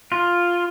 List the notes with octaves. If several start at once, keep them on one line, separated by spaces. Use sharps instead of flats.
F4